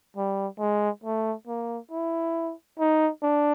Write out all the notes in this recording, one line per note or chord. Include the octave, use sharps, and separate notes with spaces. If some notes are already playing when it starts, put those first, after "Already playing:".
G3
G#3
A3
A#3
E4
D#4
D4